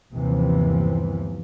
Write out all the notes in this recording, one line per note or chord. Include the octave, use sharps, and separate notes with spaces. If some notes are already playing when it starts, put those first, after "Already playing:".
G1 D#2 C3 E3 F3